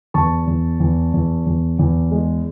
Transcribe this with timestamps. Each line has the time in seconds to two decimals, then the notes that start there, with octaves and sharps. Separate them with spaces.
0.14 E2 A5 C#6
0.47 E2
0.80 E2
1.13 E2
1.46 E2
1.79 E2
2.11 G#3